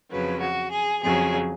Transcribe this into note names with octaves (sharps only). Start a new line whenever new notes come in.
F2 C#3 F#3 B4
F#4
G#4
F2 C#3 F#3 G#4